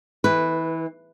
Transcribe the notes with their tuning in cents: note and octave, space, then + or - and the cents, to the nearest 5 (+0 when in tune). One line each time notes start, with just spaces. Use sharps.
E3 -25 B4 +0